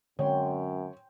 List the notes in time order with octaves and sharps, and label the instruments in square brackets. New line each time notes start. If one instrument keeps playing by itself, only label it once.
[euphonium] F#2 [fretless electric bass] D3 G#3 C4 [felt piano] C#5 [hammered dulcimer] G5 G#5 C6